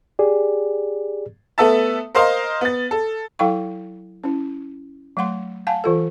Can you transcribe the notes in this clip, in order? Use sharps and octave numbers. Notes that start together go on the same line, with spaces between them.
G4 G#4 D5
A3 B3 A4 E5 A5
A#4 C5 D#5 F5 A#5 C6
B3 A6
A4
F#3 E4 A4 F5 G5 C#6
C#4 E4
F#3 A3 F#5 C6
F5 F#5 G#5 A5
E3 F4 A4